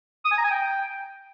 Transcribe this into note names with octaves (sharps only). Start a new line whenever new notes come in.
D#6
G#5
A#5
G#5
G5